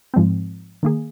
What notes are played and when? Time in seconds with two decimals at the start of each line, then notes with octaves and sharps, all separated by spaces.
0.14 G#2 F3 G#3 C4
0.83 D#3 A#3 G#4